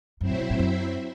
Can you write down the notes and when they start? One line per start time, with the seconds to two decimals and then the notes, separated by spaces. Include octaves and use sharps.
0.20 F#2 F#3 C4 E4 C5 E5
0.30 A2
0.40 C3
0.50 A2
0.59 F#2